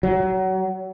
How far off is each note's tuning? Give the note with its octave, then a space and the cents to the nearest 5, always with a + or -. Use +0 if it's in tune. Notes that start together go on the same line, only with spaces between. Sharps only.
F#3 +25